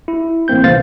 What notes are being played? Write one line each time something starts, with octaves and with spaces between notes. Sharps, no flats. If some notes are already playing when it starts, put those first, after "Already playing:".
E4
A1 A#3 C4 G6
C2 C#3 E3 C5 F5 A6